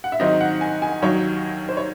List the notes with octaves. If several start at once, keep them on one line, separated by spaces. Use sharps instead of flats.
F#5
E5
G#2 D#3 F#3 C4 D#4 D#5
F#5
G#5
G#5
D#2 D#3 F#3 C#5
C5
C#5